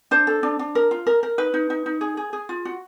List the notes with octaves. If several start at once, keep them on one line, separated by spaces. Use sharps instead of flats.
D4 C5
A4
D4
D4
A#4
F4
A#4
A#4
D#4 B4
D#4
D#4
D#4
G#4
G#4
G#4
F4
F#4